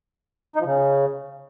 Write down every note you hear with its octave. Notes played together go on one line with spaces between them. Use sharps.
D#4
F3
C#3